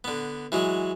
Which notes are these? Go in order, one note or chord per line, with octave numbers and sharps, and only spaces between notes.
D3 B3
E3 F#3 G#3